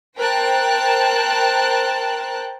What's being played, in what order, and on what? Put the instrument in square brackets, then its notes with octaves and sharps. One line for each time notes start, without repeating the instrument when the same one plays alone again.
[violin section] A#4 C5 G5 A5 F#6